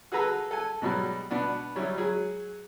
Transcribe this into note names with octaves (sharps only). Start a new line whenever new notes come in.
F#4 G#4 A4 B4 A#5 E6
A4 G#5
G#2 B2 F#3 G3
B2 B3 D4
F#3 G3 C#4 E4
F#3 G#4